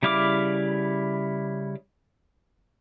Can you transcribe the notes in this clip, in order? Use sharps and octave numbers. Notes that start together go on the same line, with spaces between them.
C#3 G3 E4 F5 D6